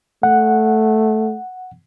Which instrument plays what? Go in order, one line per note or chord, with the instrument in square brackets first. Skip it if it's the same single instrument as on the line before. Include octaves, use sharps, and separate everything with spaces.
[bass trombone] A3 [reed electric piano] F#5